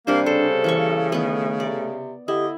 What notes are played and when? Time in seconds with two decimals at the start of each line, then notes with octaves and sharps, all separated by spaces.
0.07 C3 G3 A#3 D4 C5
0.26 C#3 A4 C5
0.64 E3 A#3 F5 C#6
1.12 D#3 A3 B3
1.60 C3 D5
2.28 D3 E4 G4 D#5